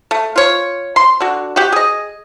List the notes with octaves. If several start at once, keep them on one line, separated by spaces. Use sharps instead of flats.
A3
F4 C#5
C6
D3 F#4
F#4 G4
G#4 D#5